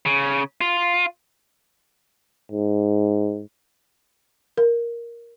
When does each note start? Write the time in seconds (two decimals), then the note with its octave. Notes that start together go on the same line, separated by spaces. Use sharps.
0.06 C#3
0.61 F4
2.52 G#2
4.58 A#4